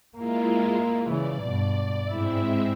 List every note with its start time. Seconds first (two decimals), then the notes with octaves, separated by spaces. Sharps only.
0.17 G#3 A#3 E4 F4
1.09 C#3 E3 D5
1.42 G2 B2
2.09 G#2 G#3 C4 E4 E5